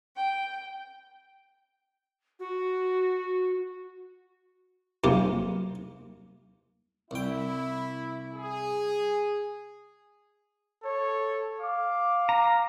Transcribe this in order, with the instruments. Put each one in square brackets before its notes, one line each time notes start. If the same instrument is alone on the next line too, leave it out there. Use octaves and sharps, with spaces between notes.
[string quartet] G5
[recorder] F#4
[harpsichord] B1 C3 A#3 F4
[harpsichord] C2 G5 [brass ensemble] E4
[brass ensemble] G#4
[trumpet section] A4 C#5
F5 D6
[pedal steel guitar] A#5